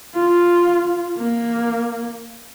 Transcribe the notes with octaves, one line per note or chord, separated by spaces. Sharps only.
F4
A#3